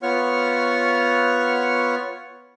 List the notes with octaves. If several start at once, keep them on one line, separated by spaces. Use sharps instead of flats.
B3 F4 C#5 F#5 C#6 F6